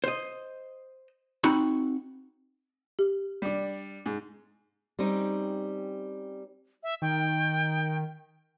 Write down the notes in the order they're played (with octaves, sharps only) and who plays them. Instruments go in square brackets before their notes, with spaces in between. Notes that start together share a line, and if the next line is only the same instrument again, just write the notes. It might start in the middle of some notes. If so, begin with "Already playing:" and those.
[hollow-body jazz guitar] C5 D#5
C4 D#4 F#4 B5
[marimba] G4
[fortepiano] G3 D4
G#2
[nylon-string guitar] G3 C4 C#4 D#4
[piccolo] E5
[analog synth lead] D#3 [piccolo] G5